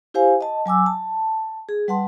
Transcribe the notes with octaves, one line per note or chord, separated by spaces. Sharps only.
E4 G4 C5 F5 G#5
D#5 A5
F#3 G#5 D6 E6
A5
G#4
G3 B4 F#5 A5 C6